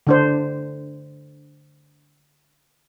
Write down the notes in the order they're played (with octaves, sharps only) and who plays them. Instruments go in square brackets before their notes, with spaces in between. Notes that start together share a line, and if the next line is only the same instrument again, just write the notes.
[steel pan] D3 D4 C5